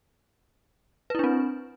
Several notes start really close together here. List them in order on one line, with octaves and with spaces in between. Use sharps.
B4 E4 D4 C4